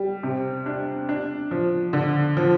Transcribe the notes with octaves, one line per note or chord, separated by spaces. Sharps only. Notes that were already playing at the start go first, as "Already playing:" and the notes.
Already playing: G3
C3
D4
D4
F3
D3
F3